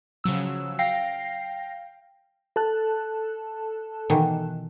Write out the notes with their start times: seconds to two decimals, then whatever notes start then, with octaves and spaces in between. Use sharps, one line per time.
0.24 C#3 F3 F#3 E6
0.79 F5 G5 A#6 C7
2.56 A4 A5 F#6
4.10 B2 D#3 E3